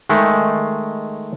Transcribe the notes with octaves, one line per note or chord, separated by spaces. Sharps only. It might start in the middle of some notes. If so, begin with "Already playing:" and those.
D#3 G#3 A3